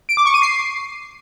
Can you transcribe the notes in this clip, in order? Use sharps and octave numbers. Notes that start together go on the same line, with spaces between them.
D7
D6
C#6
D#7
C7